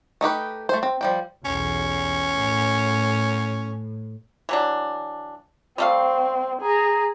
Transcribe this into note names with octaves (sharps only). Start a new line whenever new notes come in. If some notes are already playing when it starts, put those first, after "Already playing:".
A3 D#4 G4 B4
A3 C5
C4
F3 G3 G5
B1 E2 C#4
A2
E3 F#3 D4
G3 A3 C4 F5
G#4 A#5